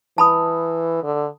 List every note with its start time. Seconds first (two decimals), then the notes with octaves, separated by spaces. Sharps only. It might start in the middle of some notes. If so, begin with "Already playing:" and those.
0.18 E3 A5 B5 D#6
1.03 D3